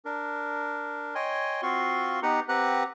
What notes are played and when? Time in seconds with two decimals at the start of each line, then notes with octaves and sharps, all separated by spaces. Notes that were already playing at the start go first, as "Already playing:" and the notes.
0.05 D4 A#4
1.15 C#5 D#5 G5 G#5 C6
1.62 C4 F4 F#4 F5 C6 C#6
2.23 B3 D#4 G4 B4 F#5 A#5
2.49 C4 G4 B4 F#5 A#5 F#6